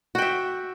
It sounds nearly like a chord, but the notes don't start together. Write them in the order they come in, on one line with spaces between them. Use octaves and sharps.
F#4 G5 E5